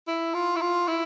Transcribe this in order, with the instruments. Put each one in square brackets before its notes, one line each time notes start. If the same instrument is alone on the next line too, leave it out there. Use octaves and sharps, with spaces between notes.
[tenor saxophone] E4
F4
E4
F4
E4